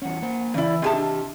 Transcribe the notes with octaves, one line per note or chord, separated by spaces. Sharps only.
E2 C#4 F#5
A#3 C5
C#3 E3 E4 D5
C3 G4 G#4 D#5 G#5 A5
D4